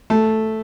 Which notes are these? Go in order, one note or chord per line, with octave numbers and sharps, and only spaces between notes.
A3